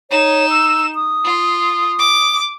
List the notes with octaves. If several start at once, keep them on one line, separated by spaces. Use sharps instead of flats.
D#4 C#5 E7
E6
D#6
F4
D6